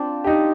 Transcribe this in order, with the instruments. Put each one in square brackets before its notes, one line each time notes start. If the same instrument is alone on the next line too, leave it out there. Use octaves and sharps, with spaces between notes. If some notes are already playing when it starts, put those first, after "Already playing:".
Already playing: [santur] C4 D4 F4
[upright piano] D#4 G4